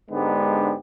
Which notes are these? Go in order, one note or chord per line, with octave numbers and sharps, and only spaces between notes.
G#2 D3 G#3 B3 D4 G4